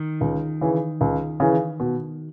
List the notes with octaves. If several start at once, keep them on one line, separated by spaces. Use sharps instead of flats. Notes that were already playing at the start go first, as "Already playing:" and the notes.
Already playing: D#3
C#2
C#3 E3
C#2
C#3 E3
B2